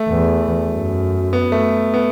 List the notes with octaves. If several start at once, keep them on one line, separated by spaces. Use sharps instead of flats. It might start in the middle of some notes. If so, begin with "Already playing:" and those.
Already playing: A3
E2
F#2
B3
A3
B3